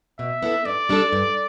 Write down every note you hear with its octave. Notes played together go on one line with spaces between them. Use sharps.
B2 E5
B3 E4 A4
G2 D5
G3 D4 A4
G2